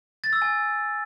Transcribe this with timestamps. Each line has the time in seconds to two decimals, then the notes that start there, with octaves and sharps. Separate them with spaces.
0.24 A6
0.33 E6
0.42 G#5